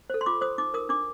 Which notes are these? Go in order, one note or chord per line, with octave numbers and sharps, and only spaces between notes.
A4 C5
C6
F4 D6
C5 D#6
D#4 D6
A#4 D#6
D4 D6